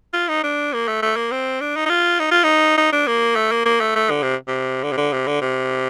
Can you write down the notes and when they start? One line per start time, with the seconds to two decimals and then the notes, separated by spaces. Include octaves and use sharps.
0.13 F4
0.28 D#4
0.44 D4
0.73 A#3
0.88 A3
1.02 A3
1.16 A#3
1.31 C4
1.61 D4
1.76 D#4
1.86 D#4
1.89 F4
2.19 D#4
2.31 F4
2.44 D#4
2.77 D#4
2.93 D4
3.07 A#3
3.36 A3
3.51 A#3
3.66 A#3
3.80 A3
3.96 A3
4.10 D3
4.22 C3
4.47 C3
4.83 D3
4.92 C3
4.97 D3
5.12 C3
5.27 D3
5.41 C3